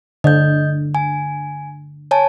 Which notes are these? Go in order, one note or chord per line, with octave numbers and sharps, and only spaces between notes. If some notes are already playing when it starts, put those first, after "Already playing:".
D3 D#5 G6
G#5
C#5 G#5 A5